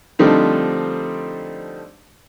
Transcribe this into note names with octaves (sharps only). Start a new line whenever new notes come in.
D3 F3 G3 A3 C4 D#4